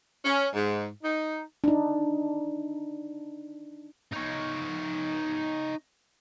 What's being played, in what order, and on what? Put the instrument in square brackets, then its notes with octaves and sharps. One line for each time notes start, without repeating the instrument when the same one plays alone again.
[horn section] C#4
G#2
D#4
[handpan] D4 D#4
[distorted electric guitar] D#4 C#5